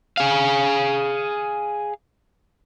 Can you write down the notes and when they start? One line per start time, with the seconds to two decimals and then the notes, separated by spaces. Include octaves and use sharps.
0.17 G#4 F5